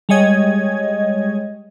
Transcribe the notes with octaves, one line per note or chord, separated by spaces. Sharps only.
G3 G#3 C#5 D#5 G#6